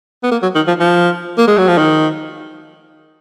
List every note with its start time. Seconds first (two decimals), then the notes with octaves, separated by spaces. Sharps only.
0.23 B3
0.31 A#3
0.42 F#3
0.55 D#3
0.67 F3
0.80 F3
1.38 A#3
1.47 G#3
1.58 F#3
1.68 F3
1.78 D#3